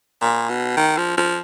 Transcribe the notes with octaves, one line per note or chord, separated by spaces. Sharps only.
A#2
B2
D#3
F3
F3